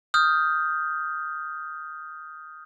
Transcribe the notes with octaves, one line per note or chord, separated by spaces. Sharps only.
D#6 F6 G6